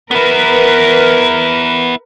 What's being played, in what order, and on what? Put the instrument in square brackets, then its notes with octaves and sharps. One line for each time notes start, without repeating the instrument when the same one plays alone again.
[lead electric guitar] B3 E4 [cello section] A#4 B4